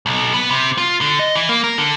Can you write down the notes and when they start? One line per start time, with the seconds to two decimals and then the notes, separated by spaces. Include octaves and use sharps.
0.06 B1
0.34 B3
0.50 C3
0.78 F4
1.01 D3
1.19 D#5
1.35 E3
1.49 A#3
1.64 A#4
1.78 D3